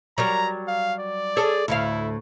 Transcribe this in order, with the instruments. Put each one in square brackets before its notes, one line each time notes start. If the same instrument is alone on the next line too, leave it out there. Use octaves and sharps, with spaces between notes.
[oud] F#3 G3 A#4 [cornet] A#5
[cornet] F5
D5
[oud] G#4 A4 C#5
[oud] D2 A2 F5 [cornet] E4